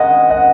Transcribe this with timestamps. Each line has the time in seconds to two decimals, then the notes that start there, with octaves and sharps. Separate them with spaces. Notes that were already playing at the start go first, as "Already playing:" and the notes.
Already playing: D#3 G#3 D#5 F#5
0.30 D#5 F#5